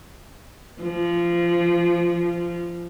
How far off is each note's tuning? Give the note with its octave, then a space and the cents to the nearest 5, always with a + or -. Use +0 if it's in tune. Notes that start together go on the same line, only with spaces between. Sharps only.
F3 -20